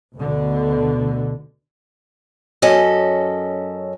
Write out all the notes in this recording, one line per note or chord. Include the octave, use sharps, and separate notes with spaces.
D2 B2 D3
F#2 C#4 A4 D#5